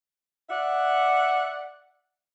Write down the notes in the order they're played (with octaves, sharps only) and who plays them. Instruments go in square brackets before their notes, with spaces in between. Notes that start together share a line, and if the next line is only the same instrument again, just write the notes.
[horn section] D5 E5 F#5